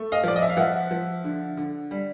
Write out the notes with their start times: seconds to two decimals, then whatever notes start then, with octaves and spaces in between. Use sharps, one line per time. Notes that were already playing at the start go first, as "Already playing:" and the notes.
Already playing: A3
0.12 D#5 F5
0.24 F3 D5
0.36 D#5
0.42 E5
0.50 F5
0.57 F3 E5 F#5
0.91 F3
1.24 D3
1.57 D3
1.91 G3